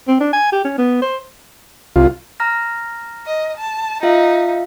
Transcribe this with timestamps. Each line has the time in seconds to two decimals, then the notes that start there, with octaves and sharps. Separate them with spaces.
0.08 C4
0.21 D4
0.33 G#5
0.52 G4
0.65 C#4
0.78 B3
1.02 C5
1.96 C2 F4
2.40 A#5 F6 A#6
3.26 D#5
3.58 A5
4.03 D#4 F4 E5 F5